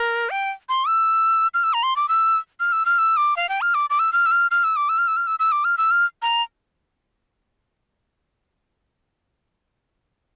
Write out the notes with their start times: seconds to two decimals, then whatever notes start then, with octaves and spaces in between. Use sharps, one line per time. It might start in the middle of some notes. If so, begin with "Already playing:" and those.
Already playing: A#4
0.30 G5
0.69 C6
0.87 E6
1.54 F6
1.64 E6
1.74 A#5
1.83 C6
1.96 D6
2.09 E6
2.60 F6
2.72 E6
2.86 F6
2.98 E6
3.17 D6
3.37 F5
3.49 G5
3.61 F6
3.74 D6
3.90 D6
3.99 E6
4.13 F6
4.26 E6
4.31 F6
4.51 F6
4.64 E6
4.76 D6
4.89 E6
4.98 F6
5.08 E6
5.17 F6
5.27 E6
5.39 E6
5.52 D6
5.64 F6
5.78 E6
5.91 F6
6.22 A#5